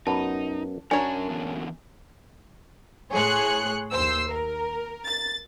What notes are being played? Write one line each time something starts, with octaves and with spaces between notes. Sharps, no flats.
F#2 B3 D#4 A5
F#2 C#4 D4 A#4 C#5 G#5 A#5
D3 E3 B3
A2 G#4 C#5 C6 F#6 C#7
D#2 C5 E6 C7
A#4
A6